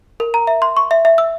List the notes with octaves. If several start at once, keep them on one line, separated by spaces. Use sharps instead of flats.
A#4
A#5
E5
C6
C#6
E5
E5
E6